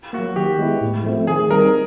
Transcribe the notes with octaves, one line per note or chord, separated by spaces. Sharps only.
A#3 F#4
F#3
D#3 G4
G#3 B3 E4
A2
F3 A3 C4
D#3 G#4
G3 C4 D#4 A#4